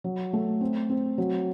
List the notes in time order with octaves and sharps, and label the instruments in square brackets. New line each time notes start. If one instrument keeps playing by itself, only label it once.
[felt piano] F#3
A3
C4
C4
F#3